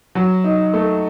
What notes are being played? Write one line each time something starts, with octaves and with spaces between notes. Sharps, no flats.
F#3
D#4
A3